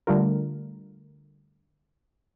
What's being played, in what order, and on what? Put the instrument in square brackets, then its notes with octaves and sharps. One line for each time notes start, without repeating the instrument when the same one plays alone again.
[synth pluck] D3 G3 A3 F4 A#4